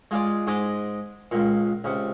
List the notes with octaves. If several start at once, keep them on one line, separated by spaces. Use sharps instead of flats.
G#3 F4 G#4 D5
G#2 G#3 D#5 C6 D6
C#2 A#2
C#2 C3